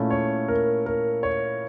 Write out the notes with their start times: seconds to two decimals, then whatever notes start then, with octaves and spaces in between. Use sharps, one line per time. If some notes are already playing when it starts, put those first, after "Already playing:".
Already playing: A#2 A3 C#4 E4
0.10 C#5
0.48 A#4
0.86 A#4
1.23 C#5